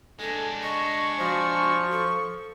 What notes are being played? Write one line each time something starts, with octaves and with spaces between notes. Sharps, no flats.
G#3 D4 A4
D#5 C#6
F3 F#4
A4